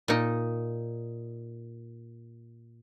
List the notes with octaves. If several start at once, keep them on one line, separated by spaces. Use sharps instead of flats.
A#2 D#4